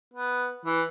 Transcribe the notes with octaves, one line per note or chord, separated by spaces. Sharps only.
B3
E3